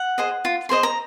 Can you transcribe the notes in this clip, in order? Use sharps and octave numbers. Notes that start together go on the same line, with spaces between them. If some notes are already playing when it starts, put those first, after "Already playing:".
Already playing: F#5
G#4 C5 D#5
F4
G#4 C5 D#5 C6
A#5